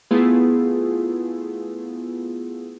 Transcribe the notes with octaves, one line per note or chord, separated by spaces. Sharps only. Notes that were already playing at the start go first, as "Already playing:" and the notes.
A3 B3 E4 F4 G#4